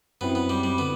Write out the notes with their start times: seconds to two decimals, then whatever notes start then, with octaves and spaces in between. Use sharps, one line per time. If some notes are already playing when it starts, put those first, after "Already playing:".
0.21 F#2 F#3 B3 C4 E4
0.35 B3
0.49 G3
0.64 G3
0.78 D3 B3